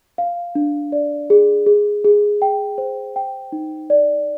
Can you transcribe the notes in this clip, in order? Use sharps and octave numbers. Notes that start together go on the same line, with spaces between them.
F5
D4
D5
G#4
G#4
G#4
G5
C5
G5
D#4
D5